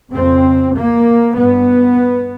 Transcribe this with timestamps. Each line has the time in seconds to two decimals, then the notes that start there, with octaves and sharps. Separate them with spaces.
0.14 F2 C#3 C4
0.75 A#3
1.36 G2 B3